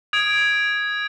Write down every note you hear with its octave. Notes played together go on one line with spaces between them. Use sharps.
D#6 G#6 D7